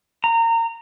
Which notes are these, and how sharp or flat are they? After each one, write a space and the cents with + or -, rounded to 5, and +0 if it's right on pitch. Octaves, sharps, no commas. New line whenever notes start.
A#5 -25